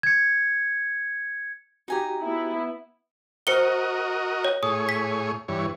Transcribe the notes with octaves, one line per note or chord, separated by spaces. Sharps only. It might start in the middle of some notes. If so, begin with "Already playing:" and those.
G#6 C#7
D#4 F#4 G4 G#5 A#5
B3 E4
F#4 A#4 C5 D#5 C#7 G7
C#5
A2 G#4 C#5 D#6
B6
G2 E3 C#5